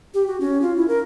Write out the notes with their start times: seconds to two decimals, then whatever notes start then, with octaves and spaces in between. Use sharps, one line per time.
0.14 G4
0.27 F#4
0.40 C#4
0.62 F4
0.76 E4
0.88 A#4